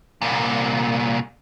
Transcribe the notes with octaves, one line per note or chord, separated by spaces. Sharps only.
C2 A#2